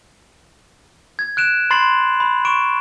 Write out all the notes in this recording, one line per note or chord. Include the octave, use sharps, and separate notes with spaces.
G#6
F#6 D7 E7
B5 C6 A6 C7 F#7
B5
C#6 D7 E7